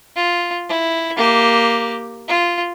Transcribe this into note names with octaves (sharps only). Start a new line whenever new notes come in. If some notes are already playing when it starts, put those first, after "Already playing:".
F4
E4
A#3 G4
F4